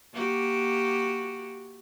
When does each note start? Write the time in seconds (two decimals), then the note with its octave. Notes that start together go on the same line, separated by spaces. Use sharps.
0.13 A#3 F#4 G4